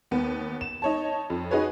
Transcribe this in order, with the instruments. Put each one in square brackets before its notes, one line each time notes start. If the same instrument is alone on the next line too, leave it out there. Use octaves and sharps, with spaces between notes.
[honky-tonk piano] D#2 B3
E7
D#4 C#5 A5
F2
D#4 F#4 G#4 B4 C#5